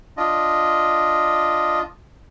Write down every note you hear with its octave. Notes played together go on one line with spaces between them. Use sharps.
D4 F4 D#5